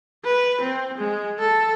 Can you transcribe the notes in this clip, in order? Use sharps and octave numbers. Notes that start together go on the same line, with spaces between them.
B4
C4
G#3
A4